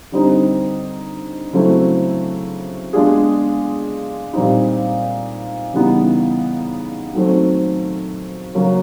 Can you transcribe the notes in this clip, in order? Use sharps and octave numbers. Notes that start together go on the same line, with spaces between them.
D3 G3 C4 D#4
C#3 F#3 A3 C4 E4
G#3 B3 D4 F4 G#4
A#2 G3 C4 D#4
C#3 E3 G3 B3 D#4
D#3 F#3 A3 C4
C#3 F#3 A#3 C#4